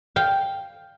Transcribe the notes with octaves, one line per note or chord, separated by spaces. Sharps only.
F5 G5